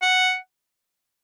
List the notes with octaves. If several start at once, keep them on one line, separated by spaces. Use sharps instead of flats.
F#5